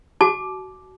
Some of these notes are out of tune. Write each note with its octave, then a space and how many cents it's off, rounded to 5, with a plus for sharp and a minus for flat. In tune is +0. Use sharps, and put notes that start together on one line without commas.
F#4 +20 A5 -40 D6 +0